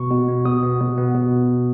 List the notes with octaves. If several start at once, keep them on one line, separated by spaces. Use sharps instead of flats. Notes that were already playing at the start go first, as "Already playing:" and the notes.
Already playing: B2 C#6
B2
B3
B2 D#6
B3
B2
B3
B2